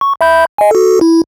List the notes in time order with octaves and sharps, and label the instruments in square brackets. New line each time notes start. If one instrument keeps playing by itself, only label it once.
[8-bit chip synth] C#6
E5 B5 G6
D#5 G#5
F#4 A4
E4